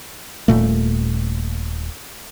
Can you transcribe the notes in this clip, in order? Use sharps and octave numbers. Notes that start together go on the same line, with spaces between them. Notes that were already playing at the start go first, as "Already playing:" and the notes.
D#1 A#2 A3